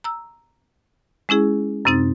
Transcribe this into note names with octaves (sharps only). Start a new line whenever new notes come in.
A#5 E6
G#3 C#4 E4 G#4
F#2 C3 C4 D#4 A6